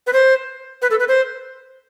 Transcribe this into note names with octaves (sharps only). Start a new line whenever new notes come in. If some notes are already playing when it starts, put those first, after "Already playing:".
B4
C5
B4
A4
B4
C5